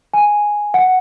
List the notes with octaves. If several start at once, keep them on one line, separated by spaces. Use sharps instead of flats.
G#5
F#5